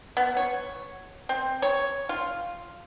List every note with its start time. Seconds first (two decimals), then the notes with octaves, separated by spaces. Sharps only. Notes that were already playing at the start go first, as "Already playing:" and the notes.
0.17 B3
0.37 C#5
1.29 C4
1.62 C#5
2.09 F4